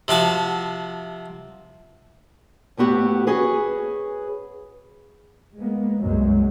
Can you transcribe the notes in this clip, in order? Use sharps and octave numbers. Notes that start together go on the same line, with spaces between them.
C3 F3 F#4 A5
D2 A2 B3 F#4 G4
C#4 F#4 G#4 B4
G#3 A#3 B3
C2 F#2 F#3 G#3